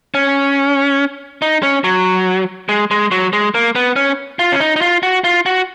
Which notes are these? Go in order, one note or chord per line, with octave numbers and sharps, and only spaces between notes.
C#4
D#4
C#4
F#3
G#3
G#3
F#3
G#3
A#3
B3
C#4
F4
C#4
D#4
D#4
F4
F#4
F4
F#4